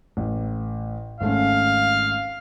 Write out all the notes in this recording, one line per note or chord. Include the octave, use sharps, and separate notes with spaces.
A1
G#1 A3 C#4 F5